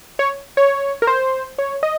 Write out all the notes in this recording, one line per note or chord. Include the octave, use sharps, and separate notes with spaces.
C#5
C#5
A#4
C5
C#5
D#5